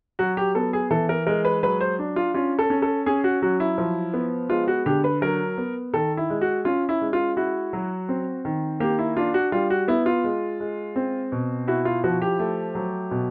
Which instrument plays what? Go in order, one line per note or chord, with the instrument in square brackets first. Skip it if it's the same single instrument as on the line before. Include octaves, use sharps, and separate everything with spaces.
[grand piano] F#3 F#4
G4
B3 A4
G#4
E3 A4
A#4
G#3 A#4
B4
F#3 B4
C5
D4
F4
C#4 F4
A4
C#4
A4
C#4 G#4
F#4
F#3 F#4
E4
F3
B3
G#3 F4
F#4
D3 G4
B4
F#3 A#4
B3
D#3 A4
E4
G#3
F#4
C#4 F4
E4
G#3
F4
E4 F#4
F#3
C4
D#3
A#3 G4
E4
D4 F4
F#4
G3 F4
F#4
B3 E4
F4
G#3
G#3
C4
B2
E4 F#4
F4
F3 F#4
G4
A3
F#3
B2